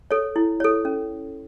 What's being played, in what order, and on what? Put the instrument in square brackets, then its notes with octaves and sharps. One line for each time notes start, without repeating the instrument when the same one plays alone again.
[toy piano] A4 C#5
E4
A4 C#5
C#4